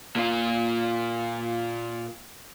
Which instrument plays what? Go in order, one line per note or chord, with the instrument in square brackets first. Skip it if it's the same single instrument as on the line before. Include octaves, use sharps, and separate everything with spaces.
[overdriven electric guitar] A#2 F4